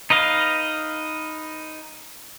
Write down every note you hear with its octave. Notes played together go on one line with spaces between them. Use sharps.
D#4 B4 D#5 F5